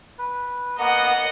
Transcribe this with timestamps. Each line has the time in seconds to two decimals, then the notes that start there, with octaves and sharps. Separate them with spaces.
0.19 B4
0.79 A#3 B3 D#5 F#5 A#5